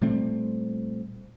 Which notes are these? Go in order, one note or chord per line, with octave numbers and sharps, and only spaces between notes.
A#2 G3 A3 C4